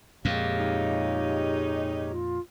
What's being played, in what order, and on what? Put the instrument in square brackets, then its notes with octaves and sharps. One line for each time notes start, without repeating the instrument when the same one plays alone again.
[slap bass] F2 A#2 [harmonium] G#3 G4 C#5 [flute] F5
[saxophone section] G#2 D#4
[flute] F4